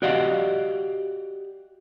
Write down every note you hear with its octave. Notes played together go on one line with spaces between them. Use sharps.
F#4 G4 D5 D#5 F5 F#5